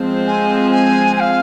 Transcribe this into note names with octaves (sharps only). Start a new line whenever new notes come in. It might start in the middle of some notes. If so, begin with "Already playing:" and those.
Already playing: F3 G#3 C4
G#5
G#5
G#5
F5